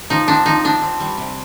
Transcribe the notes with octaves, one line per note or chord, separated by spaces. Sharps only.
F3 D#4
C4 D4
F3 D#4
C4 D4
C4
G3
C3